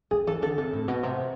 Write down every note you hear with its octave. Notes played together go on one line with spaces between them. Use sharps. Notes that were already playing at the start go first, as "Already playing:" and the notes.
F3 G#4
E3 A4
D3 A4
C3 A4
A2
B2
C3